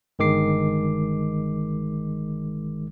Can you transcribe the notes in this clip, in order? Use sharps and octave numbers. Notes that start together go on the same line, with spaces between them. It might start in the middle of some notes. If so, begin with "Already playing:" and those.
G1 D#3 G#3 D6 C7